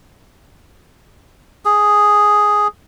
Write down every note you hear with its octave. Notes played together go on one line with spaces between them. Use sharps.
G#4